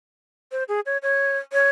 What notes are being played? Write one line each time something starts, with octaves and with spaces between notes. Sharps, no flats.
C5
G#4
C#5
C#5
C#5